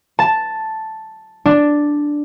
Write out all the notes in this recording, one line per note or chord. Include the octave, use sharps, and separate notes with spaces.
A5
D4